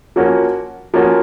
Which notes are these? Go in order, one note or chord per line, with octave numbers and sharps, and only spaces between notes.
F3 A#3 C#4 F#4
F3 A#3 C#4 F#4